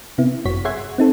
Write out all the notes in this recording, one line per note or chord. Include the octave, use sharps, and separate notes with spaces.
C3 B3 E4
G1 F#2 F#4 C#5 B6
G#4 C#5 E5 F#5 C6 G#6
C4 D#4 A4